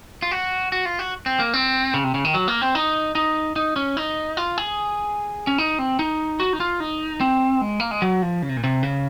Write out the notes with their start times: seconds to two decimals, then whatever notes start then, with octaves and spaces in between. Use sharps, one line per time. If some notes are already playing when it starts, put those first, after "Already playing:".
0.22 F4
0.31 F#4
0.72 F#4
0.85 F4
0.99 F#4
1.26 C4
1.39 A#3
1.53 C4
1.94 C#3
2.04 C3
2.14 C#3
2.25 D#3
2.34 F#3
2.48 A#3
2.61 C4
2.75 D#4
3.15 D#4
3.56 D#4
3.76 C#4
3.97 D#4
4.37 F4
4.58 G#4
5.47 C#4
5.58 D#4
5.79 C4
5.99 D#4
6.40 F#4
6.53 D#4
6.60 F4
6.80 D#4
7.21 C4
7.61 G#3
7.80 A#3
7.91 G#3
8.02 F#3
8.22 F3
8.42 C#3
8.49 C3
8.57 A#2
8.64 C3
8.83 C#3